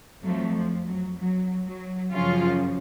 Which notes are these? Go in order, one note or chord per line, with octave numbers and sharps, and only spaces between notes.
F2 F3 F#3 A3
F3
F#3
F#3
F#3
F#2 C#3 F3 C#4 F4